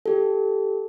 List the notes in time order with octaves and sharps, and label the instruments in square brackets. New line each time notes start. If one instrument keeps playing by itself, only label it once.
[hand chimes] G4 A4